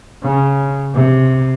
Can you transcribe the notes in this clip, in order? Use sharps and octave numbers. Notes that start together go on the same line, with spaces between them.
C#3
C3